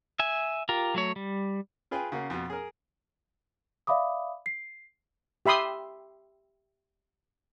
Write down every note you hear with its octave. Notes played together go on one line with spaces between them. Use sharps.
E5 G#5
F4 G4 A#4
F#3 A3 C#5
G3
F4 G#4 B4 G5 G#5
C#3 A#3 F#4
F2 B2
G#4 A#4
D5 E5 F5 B5 D6 D#6
C7
G4 E5 B5 C6 D#6